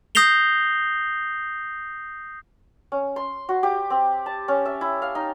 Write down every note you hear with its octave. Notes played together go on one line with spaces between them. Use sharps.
D#6 G6 A#6 C7 F7 G7
C#4
C6
F#4
G4
C4
A5
C#4
E5
E4
F5
D#4